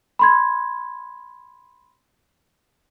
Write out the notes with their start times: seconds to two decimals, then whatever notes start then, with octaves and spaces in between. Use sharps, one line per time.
0.19 B5 C6 G#6